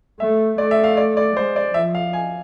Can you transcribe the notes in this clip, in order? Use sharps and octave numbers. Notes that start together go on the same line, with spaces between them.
A3 E5
A3 D5
E5
F5
D5
D5
G#3 C5
D5
F3 E5
F5
G#5